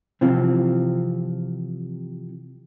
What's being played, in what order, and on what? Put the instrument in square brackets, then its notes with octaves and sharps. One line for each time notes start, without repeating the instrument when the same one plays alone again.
[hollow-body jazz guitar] C3 E3 F3 C4